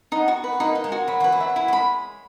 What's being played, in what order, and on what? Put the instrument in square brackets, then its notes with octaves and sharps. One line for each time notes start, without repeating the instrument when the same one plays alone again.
[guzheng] B3 [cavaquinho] D#4
[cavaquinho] F#4
B4
[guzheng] A#3 [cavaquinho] D#4
[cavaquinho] D#4
[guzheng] G#3
[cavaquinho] F#4
[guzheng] F#3 [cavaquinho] B5
[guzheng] E3 [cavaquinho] B4
[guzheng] F#3
[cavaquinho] E5
[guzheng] F#3 [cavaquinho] E4
[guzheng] G#3 [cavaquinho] B5